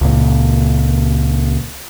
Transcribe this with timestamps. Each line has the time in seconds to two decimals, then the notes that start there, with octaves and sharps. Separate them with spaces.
0.01 C#2 A#2